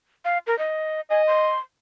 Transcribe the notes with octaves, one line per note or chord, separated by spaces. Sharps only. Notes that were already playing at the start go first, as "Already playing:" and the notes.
F5
A#4
D#5
D#5 G#5
C6